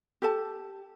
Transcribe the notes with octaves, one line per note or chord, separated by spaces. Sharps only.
G4 A4 A5